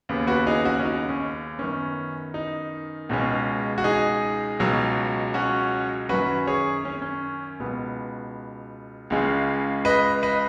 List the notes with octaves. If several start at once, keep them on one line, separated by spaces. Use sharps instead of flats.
D#2 C#3 B3
F#4 B4
D#4 G#4
C#4 F#4
C#4
D#4
C#4
F#2 D#3 B3 C#4
D#4
C#2 B2 G#3 C#4
F#4
D#4 G#4
C#2 B2 F#3
C#4 F#4
F#2 D#3 F#3 C#4 F#4 B4
G#4 C#5
C#4
C#4
C#2 B2 B3
C#2 C#3 G#3 C#4
B4 D#5
B4 D#5